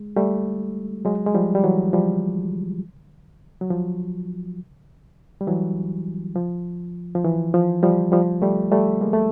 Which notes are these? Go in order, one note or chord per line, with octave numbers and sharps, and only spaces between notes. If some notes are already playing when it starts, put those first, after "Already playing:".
Already playing: G#3
G3 A3
F#3 G#3
G#3
F3 G3
G3
E3 F#3
F3 G3
F#3
F3
G3
E3 F#3
F3
F3
E3
F3
F3 G3
F3 G3
G3 A3
G3 A3
G#3 A#3
A3